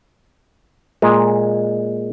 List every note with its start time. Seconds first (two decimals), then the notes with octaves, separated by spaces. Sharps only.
1.02 A#2 G#3